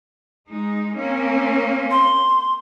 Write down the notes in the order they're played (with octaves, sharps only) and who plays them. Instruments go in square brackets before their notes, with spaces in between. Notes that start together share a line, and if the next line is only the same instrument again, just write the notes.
[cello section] G#3 D#4
A#3 C4 C#4
[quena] C6